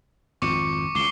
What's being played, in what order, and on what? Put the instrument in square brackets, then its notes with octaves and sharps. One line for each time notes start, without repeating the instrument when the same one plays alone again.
[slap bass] G#1 F2 F3 [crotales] C#6 D6 C#7
[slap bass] C#2 C#3 [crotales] D6 C7 G7